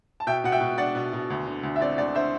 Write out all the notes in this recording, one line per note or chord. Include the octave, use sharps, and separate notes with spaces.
A5
B2 E5 G5
B2 F#5
E5 G5
B2
D4 D5 F#5
B2
B2
D2
D3
D2
E5
C4 D5
D2 D5
D3 C5 E5